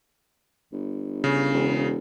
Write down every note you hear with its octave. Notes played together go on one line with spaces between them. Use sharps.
G1
C#3
E1